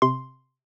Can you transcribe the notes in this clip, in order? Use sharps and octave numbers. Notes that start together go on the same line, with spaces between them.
C3 C6